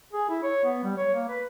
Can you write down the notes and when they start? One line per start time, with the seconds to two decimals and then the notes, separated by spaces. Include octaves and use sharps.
0.13 G#4
0.29 E4
0.43 C#5
0.64 B3
0.84 G3
0.98 C#5
1.14 A#3
1.28 B4